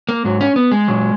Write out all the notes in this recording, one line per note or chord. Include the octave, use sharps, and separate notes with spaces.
A#3
G#2 F#3
C#4
B3
G#3
A#2 F#3